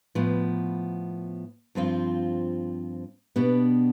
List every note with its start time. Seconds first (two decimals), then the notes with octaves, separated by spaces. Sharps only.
0.15 A2 F3 B3
1.75 G2 F3 C4 F4
3.36 B2 B3 D4 G4